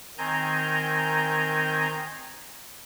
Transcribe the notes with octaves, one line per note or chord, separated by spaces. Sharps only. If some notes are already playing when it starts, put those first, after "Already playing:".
D#3 C4 G#5 A#5 G6